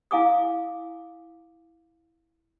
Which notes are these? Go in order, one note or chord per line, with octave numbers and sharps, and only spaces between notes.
E4 F5 G#5 D6 D#6